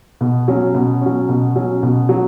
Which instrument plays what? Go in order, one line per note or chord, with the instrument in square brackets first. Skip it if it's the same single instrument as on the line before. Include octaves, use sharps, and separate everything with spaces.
[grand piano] B2
F#3 C#4
B2
F#3 C#4
B2
F#3 C#4
B2
F#3